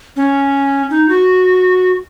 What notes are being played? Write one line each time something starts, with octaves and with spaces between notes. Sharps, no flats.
C#4
D#4
F#4